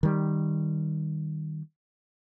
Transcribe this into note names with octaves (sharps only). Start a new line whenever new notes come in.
D#3 G3